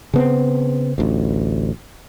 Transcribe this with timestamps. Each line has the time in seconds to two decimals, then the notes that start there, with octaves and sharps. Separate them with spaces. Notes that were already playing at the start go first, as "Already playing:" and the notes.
0.14 C#3 B3 C4
0.98 A1 D2